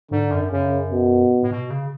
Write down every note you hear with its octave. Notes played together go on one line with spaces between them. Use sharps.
G#2 D3
F#2
F#2 C#3
B2
A2
B2
C#3